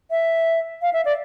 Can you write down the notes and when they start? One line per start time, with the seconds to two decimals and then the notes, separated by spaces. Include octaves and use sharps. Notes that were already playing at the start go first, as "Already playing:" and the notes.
0.11 E5
0.82 F5
0.93 E5
1.05 D5